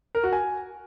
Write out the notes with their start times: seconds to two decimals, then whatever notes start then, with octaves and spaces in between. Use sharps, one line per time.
0.15 A#4
0.24 F#4
0.33 G#5